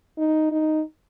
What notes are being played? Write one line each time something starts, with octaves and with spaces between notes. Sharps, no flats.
D#4
D#4